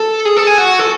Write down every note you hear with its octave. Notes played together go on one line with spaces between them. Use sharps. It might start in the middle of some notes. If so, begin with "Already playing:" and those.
Already playing: A4
G#4
A4
G#4
F#4
A4